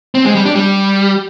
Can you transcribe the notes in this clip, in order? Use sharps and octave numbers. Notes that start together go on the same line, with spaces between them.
C4
G#3
G3
D4
G3